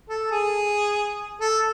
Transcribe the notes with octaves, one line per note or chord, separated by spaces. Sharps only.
A4
G#4
A4